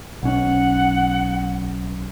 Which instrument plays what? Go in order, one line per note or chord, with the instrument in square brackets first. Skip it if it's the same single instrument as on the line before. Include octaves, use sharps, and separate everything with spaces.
[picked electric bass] B1 C#4 [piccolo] F#5